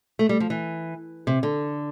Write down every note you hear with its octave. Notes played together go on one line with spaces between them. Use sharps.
A3
G3
F3
E3
C3
D3